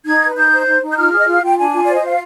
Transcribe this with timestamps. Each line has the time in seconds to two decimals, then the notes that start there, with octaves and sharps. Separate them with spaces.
0.06 D#4 G#6
0.22 B4
0.36 D#4 G6
0.51 C5
0.67 D#4
0.82 D#4
0.92 G6
0.97 F4 F6
1.12 G#4
1.18 D#5
1.27 F4 F5
1.42 F4 G5
1.58 D4 G#5
1.73 F4
1.83 C5 D5
1.94 D#5
2.03 F4 F5